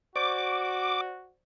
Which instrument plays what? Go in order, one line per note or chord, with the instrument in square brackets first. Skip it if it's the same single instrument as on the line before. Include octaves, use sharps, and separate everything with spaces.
[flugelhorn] F#4 [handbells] C5 D5 C#6 [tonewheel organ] D6